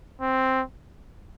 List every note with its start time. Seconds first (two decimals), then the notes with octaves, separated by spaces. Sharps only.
0.21 C4